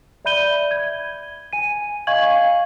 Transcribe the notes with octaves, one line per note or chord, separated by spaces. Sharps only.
D5 E5 B5 G6 D#7 G7
G#6
G#5 D#7
D#5 F5 G#5 C#6 G#6 F#7